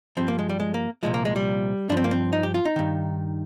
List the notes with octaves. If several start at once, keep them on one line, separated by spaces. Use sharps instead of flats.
G2 F3 C4
A#3
G#3
G3
G#3
A#3
C2 A#2 F3 G#3
A#3
G#3
G3
G2 F3 D4
C4
A#3
C4
D#4
G4
F4
D#4
G2 D#3